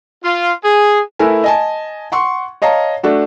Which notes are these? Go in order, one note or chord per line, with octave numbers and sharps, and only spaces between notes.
F4
G#4
A3 E4 A#4 B4 G#5
D#5 G#5 A5
F#5 C6 C#6
C#5 D#5 F5 A5 A#5
A3 D4 F#4